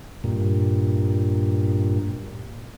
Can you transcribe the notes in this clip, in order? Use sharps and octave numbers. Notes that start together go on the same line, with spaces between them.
G2 A#2